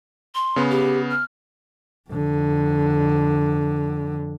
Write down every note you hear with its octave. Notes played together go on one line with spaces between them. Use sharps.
C6
C#3 B3
G4
F6
F2 D3